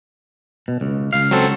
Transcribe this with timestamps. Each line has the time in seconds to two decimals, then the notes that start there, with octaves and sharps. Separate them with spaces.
0.68 B2
0.81 C#2
1.13 C#2 F5
1.31 F#3 C4 A4